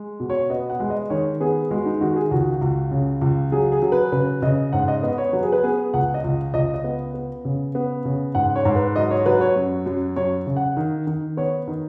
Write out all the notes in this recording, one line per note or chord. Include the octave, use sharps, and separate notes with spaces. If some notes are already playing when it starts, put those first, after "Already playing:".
Already playing: G#3
B2
C#5
B3 D#5
F#5
G#3
D#5
D#3 C#5
B3 G#4
G#3 F#4
D#4
D#3 F#4
G#4
C#2 F#4
C#2
C#3
C#2
F#3 G#4
G#4
F#3
B4
C#3 B4
C#3 D#5
G#2 F#5
D#5
B3 D#5
C#5
F#3 B4
G#4
B4
B3 G#4
C#2 F#5
D#5
C#2
C#2 D#5
D#5
B3
B3
C#3
B3
C#3
G#2 F#5
C#5
G#2
B4
F#3 D#5
C#5
F#3 B4
C#5
F#2
F#2
F#2 C#5
C#3
F#5
D#3
D#3
B3 C#5
D#3